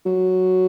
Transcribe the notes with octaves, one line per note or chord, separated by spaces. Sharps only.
F#3